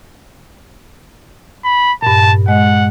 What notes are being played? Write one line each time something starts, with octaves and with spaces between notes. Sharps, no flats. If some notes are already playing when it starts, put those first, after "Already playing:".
B5
G2 A#2 A5
G#3 D#5 F#5